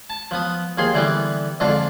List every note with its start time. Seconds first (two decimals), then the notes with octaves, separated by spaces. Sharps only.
0.10 A5
0.31 F3 B3 D#6
0.78 D#2 F3 G#4 C6
0.94 D3 E3 G3 B3 D#4
1.60 F2 G#2 D3 D4 F4 A4